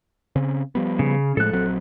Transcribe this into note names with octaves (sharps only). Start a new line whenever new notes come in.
C#3 C4 C#4
F3 G3 B3
C#3
A2 F3 G#3 A4 F#6
A#1 F#3 C4